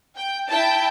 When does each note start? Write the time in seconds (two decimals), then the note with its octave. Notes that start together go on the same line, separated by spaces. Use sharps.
0.16 G5
0.48 E4 G5 A5